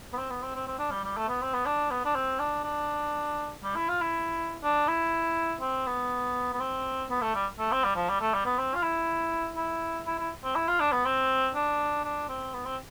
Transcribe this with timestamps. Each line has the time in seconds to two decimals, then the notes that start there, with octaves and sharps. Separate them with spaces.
0.13 B3
0.18 C4
0.30 B3
0.42 C4
0.55 C4
0.67 C4
0.79 D4
0.91 G3
1.04 G3
1.17 A3
1.29 B3
1.42 C4
1.54 B3
1.66 D4
1.91 B3
2.05 D4
2.15 C4
2.40 D4
2.64 D4
3.63 G3
3.76 E4
3.88 F4
4.01 E4
4.63 D4
4.88 E4
5.61 C4
5.86 B3
6.53 B3
6.60 C4
7.10 B3
7.21 A3
7.35 G3
7.59 A3
7.72 C4
7.84 G3
7.96 F3
8.09 G3
8.21 A3
8.34 G3
8.45 B3
8.58 C4
8.74 F4
8.82 E4
9.56 E4
10.06 E4
10.19 E4
10.44 C4
10.56 E4
10.68 F4
10.80 D4
10.92 B3
11.05 C4
11.55 D4
12.04 D4
12.29 C4
12.54 B3
12.65 C4